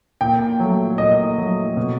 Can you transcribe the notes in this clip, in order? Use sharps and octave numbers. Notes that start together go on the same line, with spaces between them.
A#2 G5
F#3 A3
A#2 D#5
F#3 A3
B2